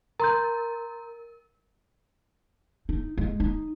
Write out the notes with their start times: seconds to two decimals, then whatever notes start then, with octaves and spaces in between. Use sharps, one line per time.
0.20 A#4 A#5 C6 G6
2.89 D#4
3.17 G#3
3.40 D#4